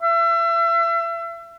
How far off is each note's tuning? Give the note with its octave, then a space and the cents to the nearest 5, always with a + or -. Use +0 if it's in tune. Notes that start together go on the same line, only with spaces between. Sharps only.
E5 +35